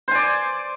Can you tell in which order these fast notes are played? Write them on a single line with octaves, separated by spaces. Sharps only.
C5 G#5 D5